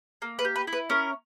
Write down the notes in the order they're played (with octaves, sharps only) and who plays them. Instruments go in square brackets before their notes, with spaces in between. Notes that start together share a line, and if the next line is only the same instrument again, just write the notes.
[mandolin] A#3
B4
G4
B4
E4
B4
C#4 A#4